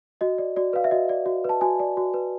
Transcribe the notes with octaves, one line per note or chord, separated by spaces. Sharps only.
F#4 D#5
D5
F#4 D5
B4 F5
E5
F#4 D#5
D5
F#4
B4 A5
F#4 G#5
D5
F#4
B4